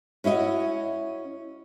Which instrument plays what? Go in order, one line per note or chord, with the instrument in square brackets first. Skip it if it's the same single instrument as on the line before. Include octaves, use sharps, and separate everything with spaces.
[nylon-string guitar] C#4 E4 F#4 D#5